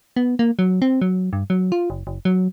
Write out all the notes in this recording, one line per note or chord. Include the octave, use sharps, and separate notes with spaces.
B3
A#3
F#3
C4
F#3
G2
F#3
F4
F#1
F#1
F#3